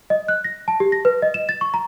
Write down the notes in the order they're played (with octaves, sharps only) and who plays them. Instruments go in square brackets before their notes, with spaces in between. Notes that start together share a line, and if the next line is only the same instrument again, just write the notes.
[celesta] D#5
F#6
A#6
A5
G4
A#6
B4
D#5
E7
A6
C#6
A#5